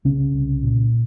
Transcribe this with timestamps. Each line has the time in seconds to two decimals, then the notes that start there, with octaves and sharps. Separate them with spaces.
0.05 C2 C#3 C#4
0.33 C2
0.64 A#2